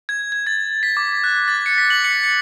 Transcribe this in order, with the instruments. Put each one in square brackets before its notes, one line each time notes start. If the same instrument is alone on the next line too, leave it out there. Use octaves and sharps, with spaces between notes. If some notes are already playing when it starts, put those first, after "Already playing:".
[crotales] G#6
G#6
A6
B6
D6
F#6
A6
C#7
B6
F#7
C#7
C#7